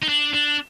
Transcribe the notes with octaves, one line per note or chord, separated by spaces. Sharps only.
D#4
D4
D4